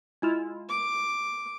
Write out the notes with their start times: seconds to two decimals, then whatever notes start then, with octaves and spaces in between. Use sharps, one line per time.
0.22 G#3 E4 F4
0.70 D6